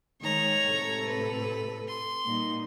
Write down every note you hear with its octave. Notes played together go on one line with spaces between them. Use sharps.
D#3 G#3 C#5 A#5
A2 C3 A4
B4
C6
A#2 G3 D#4